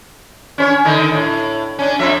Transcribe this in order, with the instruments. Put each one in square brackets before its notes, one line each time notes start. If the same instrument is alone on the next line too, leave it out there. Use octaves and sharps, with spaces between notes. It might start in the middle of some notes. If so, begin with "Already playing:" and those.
[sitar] C#4 C5 C#5
D3 D#3 D#4
A2
C#4 D4
F2 F3 E5